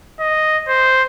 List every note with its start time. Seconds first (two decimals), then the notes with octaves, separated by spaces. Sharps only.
0.20 D#5
0.68 C5